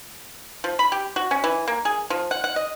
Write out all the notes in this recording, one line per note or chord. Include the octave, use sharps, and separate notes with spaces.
F3
B5
G4
F#4
C#4
E3
A#3
G#4
F3
F#5
F#5
D#5